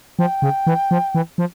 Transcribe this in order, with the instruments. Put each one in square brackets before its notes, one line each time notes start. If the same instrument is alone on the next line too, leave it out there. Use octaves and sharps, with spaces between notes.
[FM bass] F3 [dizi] G5
[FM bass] C#3
E3
F3
E3
F3